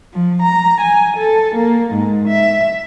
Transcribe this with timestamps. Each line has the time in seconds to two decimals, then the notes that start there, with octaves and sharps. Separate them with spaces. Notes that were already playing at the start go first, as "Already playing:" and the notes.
0.13 F3
0.42 A#5
0.80 G#5
1.17 A4
1.55 A#3
1.92 G#2
2.28 E5